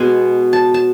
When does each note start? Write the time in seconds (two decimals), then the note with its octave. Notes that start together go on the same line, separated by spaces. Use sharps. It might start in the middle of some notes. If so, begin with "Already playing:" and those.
Already playing: B2 G#3 B3 G#5
0.53 A5
0.74 A5